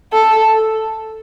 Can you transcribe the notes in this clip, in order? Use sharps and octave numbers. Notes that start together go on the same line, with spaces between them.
A4